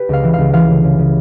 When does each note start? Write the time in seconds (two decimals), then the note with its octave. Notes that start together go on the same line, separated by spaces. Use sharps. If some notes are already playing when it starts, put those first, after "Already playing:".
Already playing: G4 B4
0.09 C#2 F5
0.24 E3
0.33 C#2 F5
0.54 E3 F5
0.69 C#3
0.84 C#3
0.98 C#3